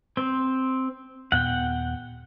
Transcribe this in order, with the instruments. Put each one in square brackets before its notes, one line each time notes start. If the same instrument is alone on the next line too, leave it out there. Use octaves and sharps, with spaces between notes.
[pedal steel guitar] C4 C5
[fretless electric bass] D#2 A#2 B3 [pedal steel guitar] F#5 G5